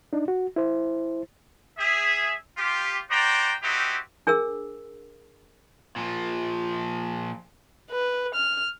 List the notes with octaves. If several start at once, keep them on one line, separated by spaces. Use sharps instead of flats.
D4 D#4
F#4
E4 C5
G#4 E5
F4 G4
F#4 C5 D5 G5 A#5
C4 D#4 E4 F#4 G4
D4 G#4 A#4 E6
A#2 F3
B4
F6